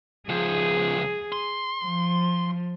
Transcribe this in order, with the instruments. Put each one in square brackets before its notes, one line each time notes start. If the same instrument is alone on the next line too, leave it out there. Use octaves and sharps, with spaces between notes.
[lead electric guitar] C#2 F3 [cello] G#4
[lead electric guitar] C6
[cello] F3